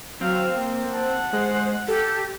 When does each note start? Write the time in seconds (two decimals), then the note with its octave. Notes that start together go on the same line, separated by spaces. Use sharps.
0.21 F#3 C4 F5
0.54 A#3
0.91 F#5 A5
1.33 G#3 C5
1.88 G4 A4